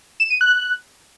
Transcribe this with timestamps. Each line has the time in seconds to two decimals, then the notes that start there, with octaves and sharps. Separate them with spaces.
0.20 E7
0.30 D#7
0.41 F#6